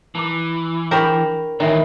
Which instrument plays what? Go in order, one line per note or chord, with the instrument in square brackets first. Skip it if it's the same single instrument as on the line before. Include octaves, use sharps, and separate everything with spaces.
[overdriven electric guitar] E3 [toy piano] A5 A#5 D6
[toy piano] D4 G#4 C#6 [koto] A#4 [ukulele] C5 G5 B5
[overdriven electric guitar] A#2 E3 [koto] D#3 [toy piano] C#5 E5 G#5